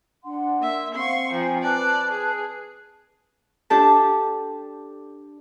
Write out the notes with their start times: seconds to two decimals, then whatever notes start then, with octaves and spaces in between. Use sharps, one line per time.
0.25 D4 F#5 C6
0.60 A#3 E5
0.95 C4 F5 F#5 C6 C#6
1.33 F3 G5 G#5 A#5
1.62 B4 D5 A5 F#6
2.11 G#4
3.70 D4 G4 A4 A5